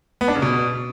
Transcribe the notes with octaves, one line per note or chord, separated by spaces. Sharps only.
B3
D4
C#3
B2